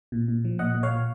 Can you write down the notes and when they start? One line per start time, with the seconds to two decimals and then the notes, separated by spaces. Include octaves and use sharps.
0.12 A#2
0.28 A#2
0.45 F3
0.59 A#2 D#5 F#5
0.75 A#2
0.83 C#5 F5
0.90 A#2